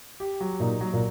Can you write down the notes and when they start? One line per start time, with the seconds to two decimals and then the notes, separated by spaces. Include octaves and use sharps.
0.20 G4
0.41 F#3
0.60 A#2 D#4
0.81 F#3
0.93 A#2